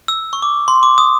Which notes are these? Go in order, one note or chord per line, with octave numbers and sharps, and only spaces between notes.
E6
C#6
D6
C6
D6
D#6